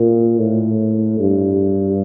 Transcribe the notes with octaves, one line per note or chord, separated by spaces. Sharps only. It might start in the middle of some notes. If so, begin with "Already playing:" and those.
Already playing: A#2
A2
G2